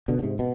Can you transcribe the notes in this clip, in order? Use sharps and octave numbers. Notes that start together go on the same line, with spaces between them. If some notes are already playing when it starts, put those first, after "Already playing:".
B2 D3
D3
G#2 C3
B2